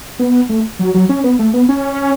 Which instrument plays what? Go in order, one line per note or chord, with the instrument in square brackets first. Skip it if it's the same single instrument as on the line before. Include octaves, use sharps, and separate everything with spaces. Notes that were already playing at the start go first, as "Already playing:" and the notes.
[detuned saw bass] B3
A3
F#3
F#3
C#4
B3
A3
B3
C#4